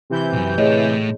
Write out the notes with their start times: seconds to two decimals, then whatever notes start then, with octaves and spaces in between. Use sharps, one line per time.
0.10 C3 E3 G6
0.33 B1 F#2
0.58 A2 G#4 C#5 D#5